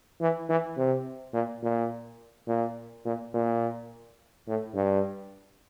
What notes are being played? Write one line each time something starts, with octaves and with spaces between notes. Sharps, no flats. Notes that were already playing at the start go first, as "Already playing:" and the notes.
E3
E3
C3
A#2
A#2
A#2
A#2
A#2
A2
G2